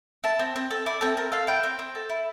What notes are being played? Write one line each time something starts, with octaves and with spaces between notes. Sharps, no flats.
E4 A5
C4
C4
A4
E4 D5
C4 A4
C4 A#4
A4 F5
E4 G5
C4
C4
A4
E4